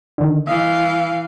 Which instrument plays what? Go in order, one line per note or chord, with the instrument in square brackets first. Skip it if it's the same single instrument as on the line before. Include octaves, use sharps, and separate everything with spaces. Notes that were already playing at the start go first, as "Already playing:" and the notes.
[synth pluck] D3 D#3
[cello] E3 F5 [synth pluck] D#5